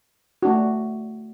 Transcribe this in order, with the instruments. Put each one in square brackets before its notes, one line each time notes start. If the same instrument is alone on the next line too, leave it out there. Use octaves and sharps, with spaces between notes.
[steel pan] A3 D4 F#4